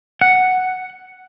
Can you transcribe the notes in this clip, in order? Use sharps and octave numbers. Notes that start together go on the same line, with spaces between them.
F#5